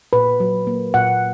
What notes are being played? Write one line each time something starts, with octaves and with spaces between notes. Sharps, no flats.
A#2 B4
F#3
A#3
A#2 F#5